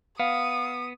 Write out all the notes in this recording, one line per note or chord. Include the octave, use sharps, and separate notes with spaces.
B3 F5 D#6